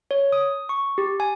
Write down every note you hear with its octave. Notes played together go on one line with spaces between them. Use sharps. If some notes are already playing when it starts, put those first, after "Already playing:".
C#5
D#6
C#6
G4
G#5